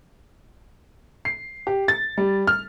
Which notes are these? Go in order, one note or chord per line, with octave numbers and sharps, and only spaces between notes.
C7
G4
A6
G3
F6